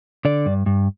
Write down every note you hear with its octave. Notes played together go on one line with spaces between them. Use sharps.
D3 D5
G2
G2